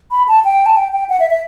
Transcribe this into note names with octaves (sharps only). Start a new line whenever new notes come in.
B5
A5
G5
A5
G5
G5
F#5
E5
E5